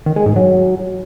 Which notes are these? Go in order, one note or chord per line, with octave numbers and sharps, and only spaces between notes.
D#3
G#3
G#2
F#3